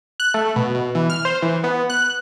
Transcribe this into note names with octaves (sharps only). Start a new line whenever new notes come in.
F#6
A3
B2
B2
E3
F6
C5
E3
B3
F#6